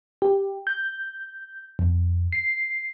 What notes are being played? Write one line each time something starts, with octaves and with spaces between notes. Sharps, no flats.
G4
G6
F2
C7